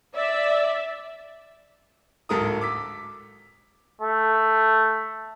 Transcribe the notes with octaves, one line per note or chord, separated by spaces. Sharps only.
D5 E5
D1 G#2 A4 A#4 D#6
D6 E6 B6
A3